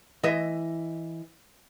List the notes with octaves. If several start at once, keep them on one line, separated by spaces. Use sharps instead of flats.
E3 D#5 E5